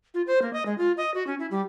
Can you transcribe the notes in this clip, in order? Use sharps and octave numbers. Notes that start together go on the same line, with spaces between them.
F4
C5
A#3
D#5
G#3
F4
D#5
F#4
C#4
E4
G3